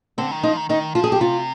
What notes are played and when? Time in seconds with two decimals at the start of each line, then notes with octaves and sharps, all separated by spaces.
0.18 D3 C4
0.31 D#3
0.43 F3 D#4
0.57 D#3
0.69 D#3 D#4
0.95 F3 F4
1.04 G#4
1.12 G4
1.20 C3 F4